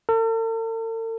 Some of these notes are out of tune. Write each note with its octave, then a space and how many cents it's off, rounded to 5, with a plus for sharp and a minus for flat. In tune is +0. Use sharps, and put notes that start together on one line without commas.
A4 +45